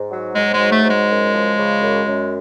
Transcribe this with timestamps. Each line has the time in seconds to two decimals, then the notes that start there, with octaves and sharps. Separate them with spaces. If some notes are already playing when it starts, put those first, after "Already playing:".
Already playing: G#2
0.11 F#3
0.35 G#2 G#3
0.53 G#3
0.59 F#3
0.71 A3
0.84 G#2
0.90 G#3
1.09 F#2
1.33 F3
1.57 C#3
1.81 F#2
2.06 F#2